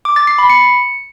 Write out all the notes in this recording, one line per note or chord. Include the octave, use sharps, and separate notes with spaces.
D6
A6
C7
B5
C#7